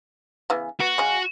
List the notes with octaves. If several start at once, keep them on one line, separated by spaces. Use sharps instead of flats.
C#3 E3 B3
B3 F#4
C#3 G#3 C#4